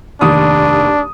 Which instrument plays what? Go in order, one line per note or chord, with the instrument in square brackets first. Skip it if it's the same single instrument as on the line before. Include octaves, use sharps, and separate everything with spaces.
[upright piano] F1 D#2 D#6 [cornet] D4